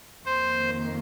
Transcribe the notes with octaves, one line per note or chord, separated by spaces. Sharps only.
F2 D#3 A#3 C5